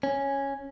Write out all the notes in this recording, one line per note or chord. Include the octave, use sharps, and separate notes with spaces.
C#4